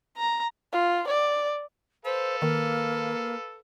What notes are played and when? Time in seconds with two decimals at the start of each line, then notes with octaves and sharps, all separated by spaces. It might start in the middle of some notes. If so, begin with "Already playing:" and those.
0.17 A#5
0.72 F4
1.08 D5
2.05 A4 B4 C5 F5
2.42 D#3 A#3